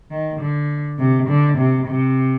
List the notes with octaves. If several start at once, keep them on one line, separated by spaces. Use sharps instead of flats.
D#3
D3
C3
D3
C3
C3